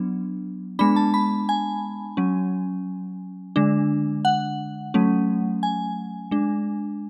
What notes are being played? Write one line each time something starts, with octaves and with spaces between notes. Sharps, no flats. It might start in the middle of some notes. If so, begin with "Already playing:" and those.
Already playing: F#3 B3 D4
G#3 B3 D4 B5
A5
B5
G#5
F#3 C#4
D3 G#3 D4
F#5
F#3 A3 C#4
G#5
G#3 D4